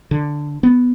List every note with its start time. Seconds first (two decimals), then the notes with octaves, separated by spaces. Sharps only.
0.11 D3
0.63 B3